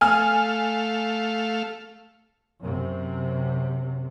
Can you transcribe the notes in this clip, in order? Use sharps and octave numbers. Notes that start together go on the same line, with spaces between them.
A3 F5 G#5 F6
F#2 C3